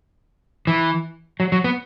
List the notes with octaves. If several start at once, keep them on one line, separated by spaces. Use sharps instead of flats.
E3
F#3
F#3
B3